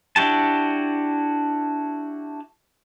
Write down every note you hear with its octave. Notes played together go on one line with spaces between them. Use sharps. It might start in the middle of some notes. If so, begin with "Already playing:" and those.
D4 E4 F#4 G4 A5